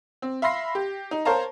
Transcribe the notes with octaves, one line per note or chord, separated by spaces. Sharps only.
C4
E5 F5 B5 C6 A#6 C7
G4
D#4
A#4 C5 C#5 F5 A5 A#5